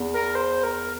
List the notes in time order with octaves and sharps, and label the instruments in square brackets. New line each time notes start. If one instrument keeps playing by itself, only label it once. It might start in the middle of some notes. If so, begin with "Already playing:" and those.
Already playing: [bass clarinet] E2
[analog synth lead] A#4
C5
A#4